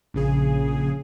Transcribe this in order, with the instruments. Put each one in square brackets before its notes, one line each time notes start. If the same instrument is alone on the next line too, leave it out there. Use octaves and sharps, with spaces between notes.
[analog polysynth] A#1 C#3 G#4